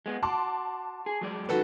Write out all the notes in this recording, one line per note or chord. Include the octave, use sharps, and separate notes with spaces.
G#3 B3
F#4 A5 C6 D6
G#4
F#3 G#3 D5
F#2 D#3 G#3 F#4 A4 B4